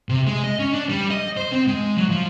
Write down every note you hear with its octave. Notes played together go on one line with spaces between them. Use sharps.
C3
G#3
D#5
C#4
D4
G3
D#5
C5
C4
G#3
F#3
F3